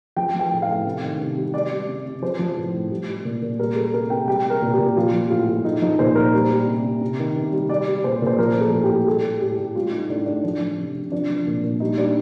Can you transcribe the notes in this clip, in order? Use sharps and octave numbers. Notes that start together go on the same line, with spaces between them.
F3 G5
F3 G5
A2
F5
A2
C3
D#3
C3
G3
G3 D5
G3
C3
C3
F3 C5
F3
A2
A2
G3
G3
A#2
A#2
G3 A#4
G3 A4
C3 A#4
C3 G5
G3 G5
G3
A#4
A#2
G4
A#2
F3 F4
F3
A2 F4
A2
F3 D#4
F3 D#4
A#2 C5
A#2 A#4
G3
G3
C3
C3
C3
D#3
C3
G3
G3 D5
G3
A#2 C5
A#2 C5
F3 A#4
F3 A4
A2
G4
A2
G3 A4
G3
A2 G4
A2
G3 F4
G3 D#4
A2 D4
A2 D4
F3 D4
F3
C3
C3
F3 D4
F3
A#2
A#2
G3 D#4
G3 D4